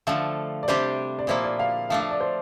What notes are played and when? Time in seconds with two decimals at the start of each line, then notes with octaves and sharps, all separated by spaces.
0.07 D3 F3 A3 F5
0.63 D5
0.68 C3 G3 D4 G4 C5
1.19 D5
1.27 A#2 F3 A#3 E4 C5
1.44 D5
1.59 F5
1.90 F3 A3 D4 F5
2.00 F5
2.11 D5
2.21 C5